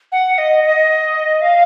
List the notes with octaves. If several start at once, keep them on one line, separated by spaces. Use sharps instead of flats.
F#5
D#5
D#5
F5